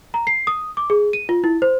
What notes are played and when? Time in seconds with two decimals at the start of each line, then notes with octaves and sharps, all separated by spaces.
0.14 A#5
0.27 C7
0.47 D#6
0.77 D6
0.90 G#4
1.13 D#7
1.29 F4
1.44 E4
1.62 C5